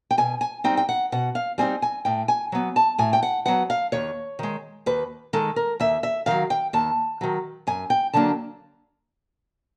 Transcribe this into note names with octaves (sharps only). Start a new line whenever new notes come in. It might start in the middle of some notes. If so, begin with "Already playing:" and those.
G5
B2 G#5
G#5
G3 C4 D#4 G5
G5
F#5
B2 F#5
F5
G3 C4 D#4 G#5
G#5
A2 G5
G#5
F#3 B3
A5
A2 G#5
G5
F#5
F#3 B3 F#5
F5
D#2 C#5
D#3 G#3
D#2 B4
D#3 G#3 A4
A#4
D#2 E5
E5
D#3 F#3 F5
G5
D#2 A5
D#3 F#3
F#2 G#5
G5
D3 F#3 A#3 D4 A5